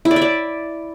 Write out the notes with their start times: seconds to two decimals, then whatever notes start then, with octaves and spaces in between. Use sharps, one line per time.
0.05 E4
0.11 D5
0.16 E5
0.22 D5